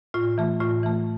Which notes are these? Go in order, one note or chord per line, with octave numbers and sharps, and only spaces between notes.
A2 F4
E3 A3
A2 F4
E3 A3